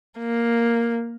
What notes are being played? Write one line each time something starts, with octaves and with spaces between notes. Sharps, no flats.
A#3